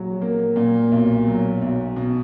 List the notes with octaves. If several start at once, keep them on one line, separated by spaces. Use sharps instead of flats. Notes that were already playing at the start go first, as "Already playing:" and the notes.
Already playing: A#1 F#3
A#3
A#2
B1
F#3
B1
B2